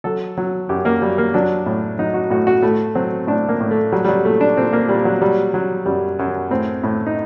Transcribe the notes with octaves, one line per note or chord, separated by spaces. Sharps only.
F#3 A4
F#3
F#2 G4
A#3
F#3 G3
A#3
F#3 D4
A2
F#3 D#4
F#4
A2 F#4
F#4
A2 A3
F#3 C4
A2 D4
A#3
A2
A3
F#3 G3
G3
F#3
A#2 A3
D4
A#2 C4
A#3
A#2 G3
F#3
F#3 G3
F#3
F#2 G3
F#2
A2 C4
A2
D#4